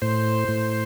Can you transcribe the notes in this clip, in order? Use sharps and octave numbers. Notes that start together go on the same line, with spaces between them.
A2 C5
A2